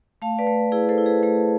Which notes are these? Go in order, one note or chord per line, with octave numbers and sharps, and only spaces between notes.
A3 F5 A5
B4 D5
A3
E4 G#4 B4
A4 C5
E4
G#4 B4
A3 G#4